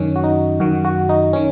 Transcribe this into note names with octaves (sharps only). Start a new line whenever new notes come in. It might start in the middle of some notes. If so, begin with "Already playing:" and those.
Already playing: F#2 D#3 C#4
F#4
D#4
F#2 D#3 F#4
F#4
D#4
D#3 C#4